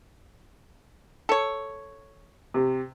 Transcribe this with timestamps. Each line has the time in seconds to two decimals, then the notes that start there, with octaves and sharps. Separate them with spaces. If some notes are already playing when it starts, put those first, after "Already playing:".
1.29 A4 C#5
2.54 C3